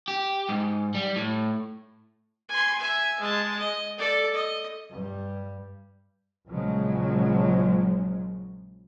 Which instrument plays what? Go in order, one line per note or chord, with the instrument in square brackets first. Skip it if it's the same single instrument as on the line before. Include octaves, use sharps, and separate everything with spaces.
[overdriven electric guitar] G4
G#2
G3
A2
[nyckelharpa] G#5 C6
E5 G#5
G#3 A5
D#5
A4 D5
D#5
[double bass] G2 G3
[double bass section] A#1 C#3 F3 F#3 G#3